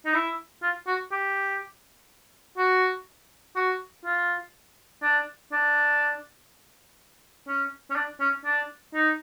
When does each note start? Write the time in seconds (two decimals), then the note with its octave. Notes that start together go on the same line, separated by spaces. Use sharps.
0.06 D#4
0.14 E4
0.63 F4
0.87 F#4
1.12 G4
2.58 F#4
3.56 F#4
4.05 F4
5.02 D4
5.52 D4
7.48 C#4
7.90 C#4
7.96 D4
8.20 C#4
8.45 D4
8.94 D#4